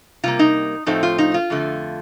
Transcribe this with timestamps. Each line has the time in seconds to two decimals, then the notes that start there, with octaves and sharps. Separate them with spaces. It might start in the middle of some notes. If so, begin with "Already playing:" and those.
0.23 C3 G3 A#3 F4
0.39 D#4
0.86 A2 F3 A3 C4 D#4
1.03 F4
1.18 D#4
1.34 F4
1.50 F2 D3 A3